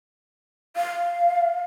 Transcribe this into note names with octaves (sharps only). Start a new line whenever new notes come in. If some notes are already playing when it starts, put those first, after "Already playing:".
F5